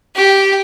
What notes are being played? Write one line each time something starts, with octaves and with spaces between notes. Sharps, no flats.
G4